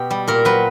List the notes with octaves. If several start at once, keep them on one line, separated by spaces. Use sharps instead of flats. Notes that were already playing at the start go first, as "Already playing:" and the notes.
Already playing: B2 G4
G3
A#2 A#4
F#3 B4